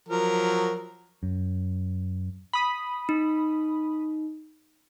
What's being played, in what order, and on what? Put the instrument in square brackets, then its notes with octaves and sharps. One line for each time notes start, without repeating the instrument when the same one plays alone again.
[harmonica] F3 F#3 A#4
[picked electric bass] F#2
[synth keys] B5 D#6
[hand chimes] D#4